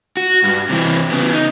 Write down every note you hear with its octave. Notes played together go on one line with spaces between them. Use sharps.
F#4
G2
C3 E3 C4
C#3 B3
D#4